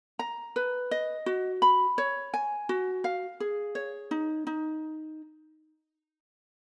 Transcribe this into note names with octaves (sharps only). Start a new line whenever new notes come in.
A#5
B4
D#5
F#4
B5
C#5
G#5
F#4
F5
G#4
C#5
D#4
D#4